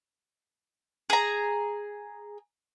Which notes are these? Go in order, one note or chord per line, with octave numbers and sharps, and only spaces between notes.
G#4 A#5